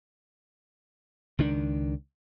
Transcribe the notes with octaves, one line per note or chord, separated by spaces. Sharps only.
C#2 D#3 D4